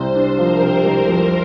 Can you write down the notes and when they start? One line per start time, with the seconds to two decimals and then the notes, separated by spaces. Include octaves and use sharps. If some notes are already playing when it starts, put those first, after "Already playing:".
Already playing: C2 C3 C5
0.15 D4
0.39 F3 A#4
0.62 C3
0.85 C2
1.08 F2